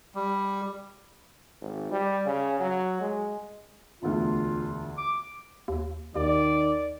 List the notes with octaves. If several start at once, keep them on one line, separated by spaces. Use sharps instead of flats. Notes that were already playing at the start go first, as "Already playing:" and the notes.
G3
G#1
G3
C#3
F#3
G#3
E1 D2 F4
D6
D#2
D#2 D#3 D5